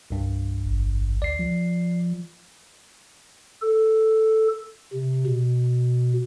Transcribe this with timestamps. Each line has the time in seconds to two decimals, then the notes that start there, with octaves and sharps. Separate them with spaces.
0.10 C2 G2
0.66 G#1
1.22 D2 D5 C7
1.39 F3
3.62 A4
4.93 C3
5.26 B2